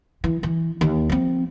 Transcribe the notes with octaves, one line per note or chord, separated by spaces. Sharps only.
E3
E3
D#2
F3 C4